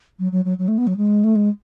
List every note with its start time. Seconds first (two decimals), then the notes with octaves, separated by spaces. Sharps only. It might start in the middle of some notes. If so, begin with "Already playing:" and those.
0.19 F#3
0.32 F#3
0.45 F#3
0.58 F#3
0.68 A3
0.78 B3
0.87 F#3
0.97 G#3
1.24 A3
1.35 G#3